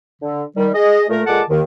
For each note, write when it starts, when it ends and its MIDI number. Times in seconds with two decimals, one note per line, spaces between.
0.21 0.43 50
0.57 0.68 51
0.57 0.68 55
0.73 1.03 68
0.73 1.03 75
1.08 1.22 46
1.08 1.22 57
1.08 1.22 70
1.26 1.41 46
1.26 1.41 56
1.26 1.41 69
1.26 1.41 78
1.26 1.41 81
1.26 1.41 86
1.49 1.61 39
1.49 1.61 51